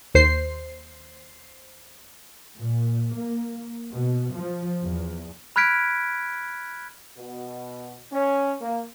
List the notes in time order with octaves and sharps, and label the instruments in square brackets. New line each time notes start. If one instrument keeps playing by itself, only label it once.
[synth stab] D#2 C5 C7
[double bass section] A#2
A#3
B2
F3
E2
[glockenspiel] B5 F6 F#6 G#6 B6 D7
[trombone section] B2
C#4
A#3